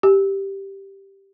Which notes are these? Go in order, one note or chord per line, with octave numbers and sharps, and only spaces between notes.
G4